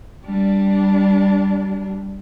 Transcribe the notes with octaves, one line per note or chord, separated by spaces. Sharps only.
G3 D4